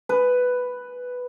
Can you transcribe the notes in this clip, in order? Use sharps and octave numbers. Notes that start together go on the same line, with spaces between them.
B4